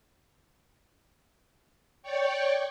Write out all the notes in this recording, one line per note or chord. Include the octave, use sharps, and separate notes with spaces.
C#5 D5 G5 C#6